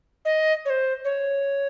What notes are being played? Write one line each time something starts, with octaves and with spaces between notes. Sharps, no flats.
D#5
C#5
C5
C#5